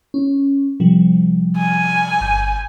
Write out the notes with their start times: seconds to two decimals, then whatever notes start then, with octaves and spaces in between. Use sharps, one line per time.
0.14 C#4
0.80 C3 F3 G3
1.58 G#5
2.20 G1 G6